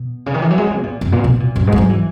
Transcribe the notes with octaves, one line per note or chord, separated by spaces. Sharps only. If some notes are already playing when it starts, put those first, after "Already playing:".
Already playing: B2
C#3
D#3
E3
F#3
G#3
F#3
B2
A#2
F#2
A#2
B2
A#2
F#2
G#2
G#3
F#3
E3